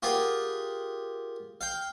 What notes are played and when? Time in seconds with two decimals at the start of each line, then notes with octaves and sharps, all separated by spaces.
0.03 F4 G4 G#4 A#4 F#5
1.61 F5 G5